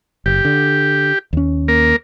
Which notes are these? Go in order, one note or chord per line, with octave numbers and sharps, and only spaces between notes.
F#1 G4
D3
D#2 C#4
A#3 A#4